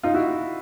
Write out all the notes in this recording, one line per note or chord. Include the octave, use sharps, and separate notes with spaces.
D#4 F4
E4 F#4